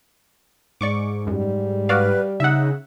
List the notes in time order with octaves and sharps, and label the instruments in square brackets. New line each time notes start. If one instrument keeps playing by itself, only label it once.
[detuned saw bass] G#2 [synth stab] D5 C#6 D6
[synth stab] F#2 [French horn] G3
[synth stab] F#4 D5 F5 [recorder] B4
[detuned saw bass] C#3 [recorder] D#4 [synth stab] E5 F#5